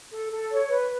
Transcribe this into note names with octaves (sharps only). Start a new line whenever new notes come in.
A4
A4
C#5
B4